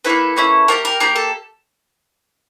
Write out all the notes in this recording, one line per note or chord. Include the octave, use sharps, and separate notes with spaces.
A#3 C#4 E4 A4 B4
A#3 C#4 E4
A#3 D4 G4 A#4
A#4
A#3 D4 G4 A#4
A4